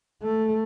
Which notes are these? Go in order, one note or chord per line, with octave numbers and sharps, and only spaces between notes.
A3